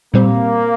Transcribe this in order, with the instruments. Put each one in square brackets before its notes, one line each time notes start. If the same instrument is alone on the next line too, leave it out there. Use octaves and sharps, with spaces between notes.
[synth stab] A#2 G3 C4 [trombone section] A#3